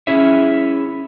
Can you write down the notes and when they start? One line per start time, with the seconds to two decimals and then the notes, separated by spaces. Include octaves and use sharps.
0.07 C#4 E4 G#4 C#5 E5